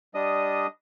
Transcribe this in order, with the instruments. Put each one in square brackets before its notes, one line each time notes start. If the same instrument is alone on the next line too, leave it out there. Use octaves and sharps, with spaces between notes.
[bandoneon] G3 D4 D#5 D#6